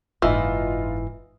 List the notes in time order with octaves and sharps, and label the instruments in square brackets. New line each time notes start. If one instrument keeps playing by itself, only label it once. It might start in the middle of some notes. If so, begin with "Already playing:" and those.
[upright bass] F#1 G#2 [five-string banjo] E3 [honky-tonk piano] D#4 F4